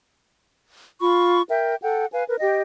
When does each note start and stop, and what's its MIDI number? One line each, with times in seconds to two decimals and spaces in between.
1.00 1.41 65
1.00 1.41 83
1.00 1.41 85
1.49 1.75 70
1.49 1.75 76
1.49 1.75 79
1.82 2.05 69
1.82 2.05 78
1.82 2.05 79
2.13 2.24 71
2.13 2.24 77
2.13 2.24 80
2.27 2.35 70
2.27 2.35 71
2.40 2.62 67
2.40 2.62 75
2.40 2.62 79